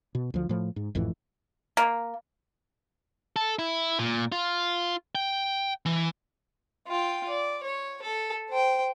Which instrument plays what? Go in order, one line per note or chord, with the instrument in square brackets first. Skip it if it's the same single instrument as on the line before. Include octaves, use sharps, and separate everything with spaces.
[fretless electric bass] B2
D2 F3
A2 F3
G#2
G#1 F2 A2 E3
[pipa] A#3
[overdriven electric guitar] A4
E4
A#2
F4
G5
E3
[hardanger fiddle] F4 G5
D5
C#5
A4
C5 G5